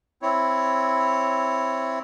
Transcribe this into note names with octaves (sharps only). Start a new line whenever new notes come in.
C4 E4 C#5